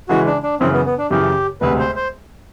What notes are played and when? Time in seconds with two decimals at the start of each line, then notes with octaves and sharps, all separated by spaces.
0.09 C#3 E3 G#3 F#4
0.26 D4
0.43 D4
0.60 F#2 C#3 E3 C4
0.73 B3
0.85 B3
0.98 D4
1.11 F#2 C#3 E3 G4
1.61 E1 D2 C3 B4
1.79 C5
1.96 C5